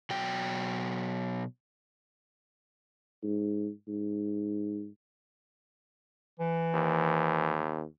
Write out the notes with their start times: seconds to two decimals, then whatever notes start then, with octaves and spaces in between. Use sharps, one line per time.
0.10 B2 F#3 G5
3.23 G#2
3.88 G#2
6.40 E3
6.74 D#2